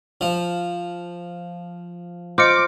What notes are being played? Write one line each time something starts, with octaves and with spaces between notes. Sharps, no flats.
F3
F4 C5 D#5 D6 C#7